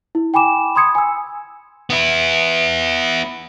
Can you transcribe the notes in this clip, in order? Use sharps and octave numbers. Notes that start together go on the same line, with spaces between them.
E4
G5 G#5 B5 D6 E7
B5 C6 D#6 G#6 C#7
G#5 E6
B3 E4